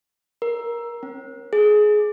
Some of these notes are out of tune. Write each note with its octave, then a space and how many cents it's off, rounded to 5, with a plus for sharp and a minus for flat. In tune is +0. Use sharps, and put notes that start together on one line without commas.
A#4 +15
C#4 -40
G#4 +20